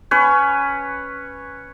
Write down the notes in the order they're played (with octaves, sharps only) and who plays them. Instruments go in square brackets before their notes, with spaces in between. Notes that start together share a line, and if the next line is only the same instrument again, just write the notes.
[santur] C#4 B4 C#5